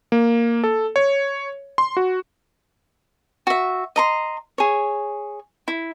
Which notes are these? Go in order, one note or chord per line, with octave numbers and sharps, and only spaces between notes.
A#3
A4
C#5
C6
F#4
F#4 E5
D#5 A#5 C6
G#4 C#5
E4